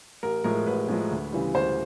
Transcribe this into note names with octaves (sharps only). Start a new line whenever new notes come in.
A1 A#4
A2 F3 G#3 A#4
A1 B4
A2 F3 G#3
D2
C#3 E3 G3
D2 C5